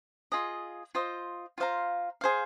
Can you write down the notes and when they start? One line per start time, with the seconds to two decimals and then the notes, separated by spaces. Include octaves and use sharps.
0.32 F4 G#4 D#5
0.95 F4 C5 D#5
1.58 F4 C5 F5 A#5
2.21 G#4 C5 F5